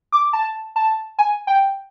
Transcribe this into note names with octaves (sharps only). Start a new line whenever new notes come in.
D6
A5
A5
G#5
G5